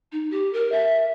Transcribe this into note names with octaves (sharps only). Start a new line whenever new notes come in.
D#4
G4
A#4
E5